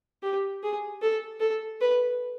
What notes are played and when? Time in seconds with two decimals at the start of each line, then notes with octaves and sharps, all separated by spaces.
0.22 G4
0.63 G#4
1.02 A4
1.40 A4
1.81 B4